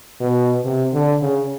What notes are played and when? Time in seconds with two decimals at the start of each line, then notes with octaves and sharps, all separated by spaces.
0.20 B2
0.64 C3
0.93 D3
1.22 C#3